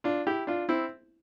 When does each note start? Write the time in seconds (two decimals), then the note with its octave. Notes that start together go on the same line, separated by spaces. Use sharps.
0.04 D4 F4
0.27 E4 G4
0.47 D4 F4
0.69 C4 E4